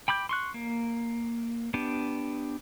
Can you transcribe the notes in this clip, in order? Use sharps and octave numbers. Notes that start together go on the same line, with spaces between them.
G5 B5 D6 G6
C6 C#6 F#6
A#3
B3 D4 G4